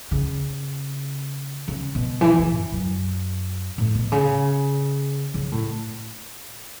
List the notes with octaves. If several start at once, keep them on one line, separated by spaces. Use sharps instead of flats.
C#3
C#3
B2
E3
C#3
F#2
F#2
A2
B2
C#3
C#3
A2